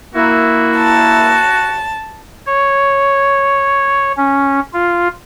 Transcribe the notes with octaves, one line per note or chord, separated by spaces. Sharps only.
A#3 E4 F#4
A5
C#5
C#4
F4